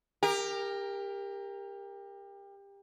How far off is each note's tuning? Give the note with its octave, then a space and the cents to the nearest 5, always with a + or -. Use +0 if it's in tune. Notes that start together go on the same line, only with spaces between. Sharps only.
G4 +25 A#4 +0